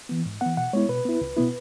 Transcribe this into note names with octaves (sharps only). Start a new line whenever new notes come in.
E3 B3
G#2
E3 B3 F#5
B2 F#5
G#3 B3 E4 C#5
B2 B4
B3 E4
C#2
B2 B3 E4